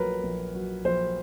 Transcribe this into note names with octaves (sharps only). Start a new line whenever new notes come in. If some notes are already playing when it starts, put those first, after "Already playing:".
Already playing: A#1 F#3 A#4 B4 C#5
A#1
F#3
A#1 C5